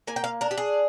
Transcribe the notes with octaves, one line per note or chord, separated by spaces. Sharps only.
A#3 G#5
G5
F5
D4 A#4
G4
G#4